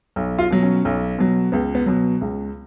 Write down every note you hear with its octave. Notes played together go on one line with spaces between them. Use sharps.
B1
F4
B2 F#3
C#4
B1
B2 F#3
C#2 B3
B3
B2 F#3
C#2